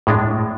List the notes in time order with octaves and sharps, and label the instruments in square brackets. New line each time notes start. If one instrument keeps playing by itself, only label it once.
[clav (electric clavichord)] A2 G#3 D4